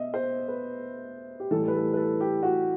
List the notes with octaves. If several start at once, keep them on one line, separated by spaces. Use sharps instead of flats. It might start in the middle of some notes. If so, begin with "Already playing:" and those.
Already playing: B2 D#5 E5
C5
B4
G4
A2 E3 G3 A4
B4
A4
B4
A4
G4
F#4